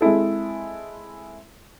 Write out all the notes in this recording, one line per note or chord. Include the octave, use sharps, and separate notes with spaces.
G#3 C4 E4 A4